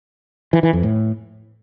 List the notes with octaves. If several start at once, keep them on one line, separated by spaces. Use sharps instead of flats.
E3
E3
F2
A2